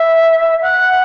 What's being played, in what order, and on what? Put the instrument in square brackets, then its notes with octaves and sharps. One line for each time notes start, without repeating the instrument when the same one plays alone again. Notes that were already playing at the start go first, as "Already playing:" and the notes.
Already playing: [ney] E5
F#5